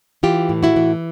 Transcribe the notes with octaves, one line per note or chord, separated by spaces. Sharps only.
E3 F4 G4
A2
E4 F#4
E3